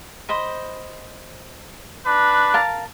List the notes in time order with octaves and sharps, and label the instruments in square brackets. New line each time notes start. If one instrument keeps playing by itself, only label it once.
[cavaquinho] C5 D#5 B5
[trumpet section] D4 B4
[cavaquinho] A#4 F5 A5